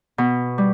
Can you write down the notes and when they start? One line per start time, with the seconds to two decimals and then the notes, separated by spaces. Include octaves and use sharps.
0.18 B2
0.58 G3